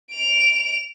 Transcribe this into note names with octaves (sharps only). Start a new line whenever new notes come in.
D7 F7